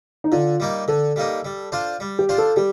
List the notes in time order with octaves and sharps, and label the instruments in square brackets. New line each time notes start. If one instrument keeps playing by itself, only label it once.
[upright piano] D#4
[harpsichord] D3 [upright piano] F4
[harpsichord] G3 A#3 D#4
[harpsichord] D3 [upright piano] A4
[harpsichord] G3 A#3 D#4
G3
D4 F4 C5
G3
[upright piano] G4
[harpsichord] D4 F4 C5
[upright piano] A4
[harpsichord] G3 [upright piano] G4